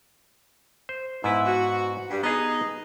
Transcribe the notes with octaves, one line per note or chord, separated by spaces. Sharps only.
C5
G#2 B3 E4 B4
F#4
G2
B3 D#4 G#4 D#5